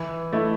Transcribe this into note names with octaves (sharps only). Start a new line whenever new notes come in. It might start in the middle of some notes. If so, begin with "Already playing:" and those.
Already playing: E3
A3 E4